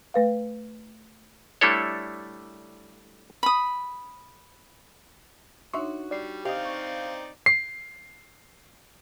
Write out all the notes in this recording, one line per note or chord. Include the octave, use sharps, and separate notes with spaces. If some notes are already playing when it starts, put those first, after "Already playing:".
A3 B4 F5
G3 A3 D4 E4 A4 C#5
B5 D#6
D4 D#4 F#4 C#5 E5 C6 C#6
G3 D5 C7
C4 D#4 G4 D5 D#5 F5
C#6
C7